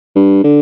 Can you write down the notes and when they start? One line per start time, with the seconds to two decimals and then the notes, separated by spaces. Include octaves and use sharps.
0.16 G2
0.44 D3